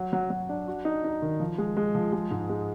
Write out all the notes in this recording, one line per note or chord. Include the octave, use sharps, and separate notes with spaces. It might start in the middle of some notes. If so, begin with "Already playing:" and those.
Already playing: F#3
F#3
F#3
D4
F#4
D#4
D#4
D#3
F3
G#3
G#3
F3
G#3
G#2
G#3